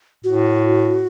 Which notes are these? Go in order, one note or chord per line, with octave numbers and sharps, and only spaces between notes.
A2 F#4